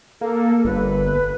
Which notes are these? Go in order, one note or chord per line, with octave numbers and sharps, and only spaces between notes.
A#3 A4
G1 B4